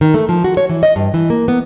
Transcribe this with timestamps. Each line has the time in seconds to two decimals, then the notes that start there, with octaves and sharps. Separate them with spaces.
0.01 D#3
0.14 A3
0.29 F3
0.44 F#4
0.57 C#5
0.69 E3
0.83 D#5
0.96 G2
1.14 E3
1.30 A#3
1.48 B3